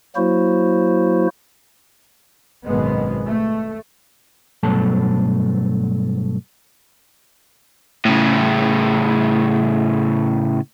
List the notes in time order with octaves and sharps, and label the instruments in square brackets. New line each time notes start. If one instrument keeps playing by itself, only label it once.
[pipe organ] F#3 A#3 E4 F#4 C5
[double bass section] G#1 F#2 B2 G#3 B3
A3
[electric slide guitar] G2 B2 F#3 A3 A4 A5
[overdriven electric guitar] A2 C#3